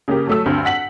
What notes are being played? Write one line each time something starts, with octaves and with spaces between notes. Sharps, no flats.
C#3 A#3 G4
F#3 A3 E6
D2 G2 C4
F#5 B6 F#7